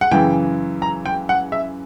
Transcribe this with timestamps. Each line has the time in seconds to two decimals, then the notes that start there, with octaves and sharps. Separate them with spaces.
0.01 F#5
0.12 F#2 C#3 E3 G5
0.82 A#5
1.06 G5
1.29 F#5
1.52 E5